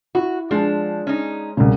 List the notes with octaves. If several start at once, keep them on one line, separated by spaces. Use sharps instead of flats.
E4 F#4
F3 G#3 D4
C#4 D#4
C2 C#3